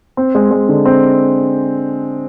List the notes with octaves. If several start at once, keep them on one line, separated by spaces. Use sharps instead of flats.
C4
G#3
G#3
D3
C4